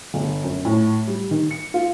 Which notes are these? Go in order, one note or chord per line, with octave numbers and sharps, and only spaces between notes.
G1
F#2
A2
G3
D#3
C#7
F4